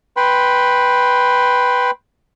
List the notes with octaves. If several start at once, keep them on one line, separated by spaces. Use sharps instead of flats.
B4 G5 B5 C6